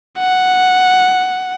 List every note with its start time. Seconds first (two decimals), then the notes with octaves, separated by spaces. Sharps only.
0.19 F#5